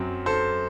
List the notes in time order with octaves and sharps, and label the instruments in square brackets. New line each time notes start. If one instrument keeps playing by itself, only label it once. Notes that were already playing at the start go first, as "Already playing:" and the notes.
Already playing: [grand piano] F#2 F#3 C4
A4 C5